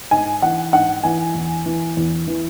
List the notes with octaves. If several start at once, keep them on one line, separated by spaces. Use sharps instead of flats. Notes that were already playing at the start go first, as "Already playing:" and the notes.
G#2 G#5
E3 F#5
G#2 F#5
E3 G#5
E2
E3
E2
E3